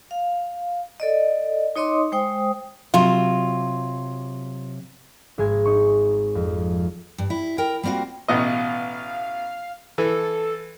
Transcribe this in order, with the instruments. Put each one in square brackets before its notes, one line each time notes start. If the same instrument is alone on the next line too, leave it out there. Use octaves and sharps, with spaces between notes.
[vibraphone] F5
A4 D5 D#5
D#4 C#5 D#5 C6 D6 D#6
G#3 C5 G5 D#6
[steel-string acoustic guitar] C3 F#3 [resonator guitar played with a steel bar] F4
[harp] G#1 G#3 G#5
D#4 C#6
F2
[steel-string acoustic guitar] G2
E4
A#4 G5
G3 A#3 C4 F4 F#4
[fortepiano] A1 B2 D#5 [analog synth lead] F5
[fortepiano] E3 [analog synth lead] A4